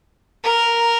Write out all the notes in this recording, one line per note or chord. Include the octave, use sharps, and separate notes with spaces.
A#4